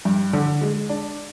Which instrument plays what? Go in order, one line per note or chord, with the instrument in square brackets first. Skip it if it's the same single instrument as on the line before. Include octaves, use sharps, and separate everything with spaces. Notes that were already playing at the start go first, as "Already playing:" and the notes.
[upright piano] G2
D3
G#3
D4